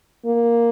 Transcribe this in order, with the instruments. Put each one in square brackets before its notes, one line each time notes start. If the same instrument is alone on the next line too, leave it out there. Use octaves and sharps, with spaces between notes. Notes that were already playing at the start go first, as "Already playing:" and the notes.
[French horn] A#3